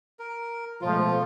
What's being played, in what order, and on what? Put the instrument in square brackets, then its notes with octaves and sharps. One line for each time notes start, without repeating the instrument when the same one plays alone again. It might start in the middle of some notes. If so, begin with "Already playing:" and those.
[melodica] A#4
[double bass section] B2 G#3 A3 [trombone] F3 [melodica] F4